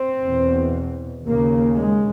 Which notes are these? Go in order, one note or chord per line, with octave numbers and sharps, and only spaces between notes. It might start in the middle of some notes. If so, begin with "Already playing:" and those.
Already playing: C4
E2 B2
D#2 C#3 A#3
G#3